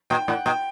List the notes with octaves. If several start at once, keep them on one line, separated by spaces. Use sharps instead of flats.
A#2 G5
A2 F#5
A#2 G5